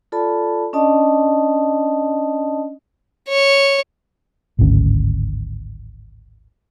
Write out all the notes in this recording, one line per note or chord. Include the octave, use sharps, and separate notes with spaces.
F4 A4 D5 A5 B5
C#4 D4 D5 D#5 A5 D#6
C#5
D1 G#1 D2 C#4